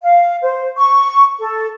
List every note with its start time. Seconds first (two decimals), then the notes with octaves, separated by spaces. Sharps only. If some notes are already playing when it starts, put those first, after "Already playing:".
0.03 F5
0.42 C5
0.78 C#6
1.41 A4